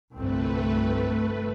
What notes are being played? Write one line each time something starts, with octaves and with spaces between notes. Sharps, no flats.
G1 C2 A3 C4 B4